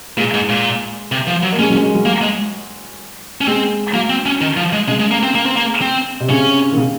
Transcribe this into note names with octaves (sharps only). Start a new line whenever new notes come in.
A#2 G#3
G#2
A#2
C3
F3
F#3
A#3
G#3 C#4
F#3
G#3
F#3
F#3 A#3
G#3
C#4
G#3 C4
F#3 A#3
C4
C#4
D#3
F3
G#3
C#3 G#3
G#3
A#3
C4
A#3
C4
A#3
C4
C3
C#3 C#4
D#3
C#3